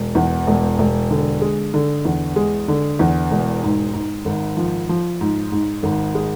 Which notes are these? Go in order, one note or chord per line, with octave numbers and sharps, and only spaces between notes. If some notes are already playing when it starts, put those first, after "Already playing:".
Already playing: E1
E2
E1
E1
D3
G#3
D3
E2
G#3
D3
E2
E1
G#2
G#2
G#1
F3
F3
G#2
G#2
G#1
G#3